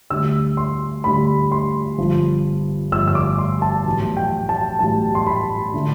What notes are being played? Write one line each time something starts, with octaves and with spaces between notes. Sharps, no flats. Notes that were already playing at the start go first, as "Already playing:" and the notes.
D2 D3 G3 E6
C6
D2 D3 G3 B5
C6
G1 G2 F3
G1 G2 F3 E6
E6
D6
C6
A5
B1 A2 E3 G3
G5
A5
B1 A2 E3 G3 A5
C6
B5
D3 A3